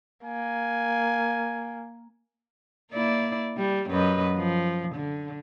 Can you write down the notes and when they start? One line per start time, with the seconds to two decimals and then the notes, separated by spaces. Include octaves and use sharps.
0.25 A#3 G#5
2.93 A#3 E4 D5
3.57 G3
3.91 F#2 B4 D#5
4.37 F3
4.95 D3